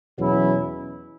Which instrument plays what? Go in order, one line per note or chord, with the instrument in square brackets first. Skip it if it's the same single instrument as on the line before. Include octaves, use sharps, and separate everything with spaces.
[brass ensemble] E2 B2 F#3 C#4 E4